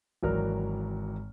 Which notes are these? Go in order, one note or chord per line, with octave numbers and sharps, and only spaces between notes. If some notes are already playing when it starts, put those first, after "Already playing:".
G#1 E3 F#3 A#4 D5 F6